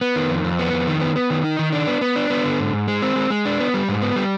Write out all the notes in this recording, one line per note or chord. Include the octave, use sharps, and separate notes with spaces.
B3
D#3
F2
F2
B3
F2
D#3
B3
B3
D#3
D#4
D#3
D4
B3
B3
D4
B3
D3
G#2
G#2
G#3
C4
G#3
G#3
D4
B3
G3
G#2
B3
G3